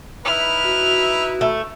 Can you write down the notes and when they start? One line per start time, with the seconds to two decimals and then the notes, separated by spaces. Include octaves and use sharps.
0.25 D#4 E4 B4 E5 F6
0.65 F#4
1.41 A3